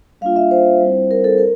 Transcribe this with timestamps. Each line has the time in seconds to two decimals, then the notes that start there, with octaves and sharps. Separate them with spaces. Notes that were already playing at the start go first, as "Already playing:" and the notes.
0.21 G3 A#3 D4 F4 F5
0.36 E5
0.51 C5
0.80 G3 C4 E4
1.11 A#4
1.24 A4
1.38 A#4